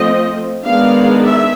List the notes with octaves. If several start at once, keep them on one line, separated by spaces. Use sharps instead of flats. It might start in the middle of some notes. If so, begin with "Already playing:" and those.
Already playing: F3 A3 C4 D#5
D#3 G#3 B3 D4 F5
E5